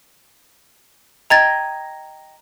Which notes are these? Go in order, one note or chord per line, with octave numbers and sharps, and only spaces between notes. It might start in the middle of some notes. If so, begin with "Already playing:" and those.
D#5 G5 A#5 G#6 A6